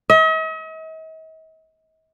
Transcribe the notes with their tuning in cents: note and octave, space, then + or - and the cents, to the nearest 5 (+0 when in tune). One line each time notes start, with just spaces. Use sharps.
D#5 +45